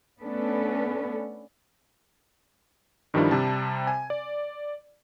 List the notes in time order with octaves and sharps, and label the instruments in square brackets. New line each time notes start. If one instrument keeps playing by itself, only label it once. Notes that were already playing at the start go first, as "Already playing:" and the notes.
[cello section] A3 B3 C#4 D4 A4 B4
[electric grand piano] G2 D#3 F3 G3 D4 E4
C3 G3 C4 A5
G#5
D5